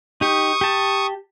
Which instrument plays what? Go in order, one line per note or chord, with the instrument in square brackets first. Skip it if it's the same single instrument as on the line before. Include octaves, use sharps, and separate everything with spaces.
[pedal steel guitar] D#4 G4 [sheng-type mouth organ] C#6 D#6
[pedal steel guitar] G4 A5